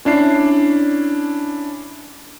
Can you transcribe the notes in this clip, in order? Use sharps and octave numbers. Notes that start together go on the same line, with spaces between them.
C#4 D4 E4 C7